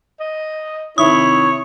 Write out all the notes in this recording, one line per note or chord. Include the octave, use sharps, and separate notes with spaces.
D#5
C3 D#3 E4 C#5 D#6